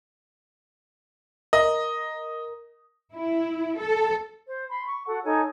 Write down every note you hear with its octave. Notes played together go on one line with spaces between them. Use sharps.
A#4 D#5
E4
A4
C5
B5 C6
C#6
F#4 A4 F#5
D#4 A4 C#5 G#5